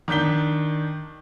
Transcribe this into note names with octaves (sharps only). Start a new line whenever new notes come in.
D#3 D4 G6 B6 G7